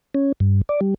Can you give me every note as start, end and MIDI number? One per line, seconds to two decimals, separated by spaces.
0.14 0.32 61
0.40 0.61 43
0.69 0.80 74
0.81 0.94 55